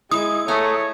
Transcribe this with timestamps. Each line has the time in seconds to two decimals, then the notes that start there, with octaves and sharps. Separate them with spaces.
0.11 G#3 E4 D#6
0.48 A3 C#5 G#5 A#5